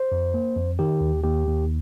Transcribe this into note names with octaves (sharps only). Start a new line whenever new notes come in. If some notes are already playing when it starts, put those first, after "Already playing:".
Already playing: C5
F2
A#3
F2
D#3 G4
D#2
D#2 G4
D#2